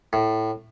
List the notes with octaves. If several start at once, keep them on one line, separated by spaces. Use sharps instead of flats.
A2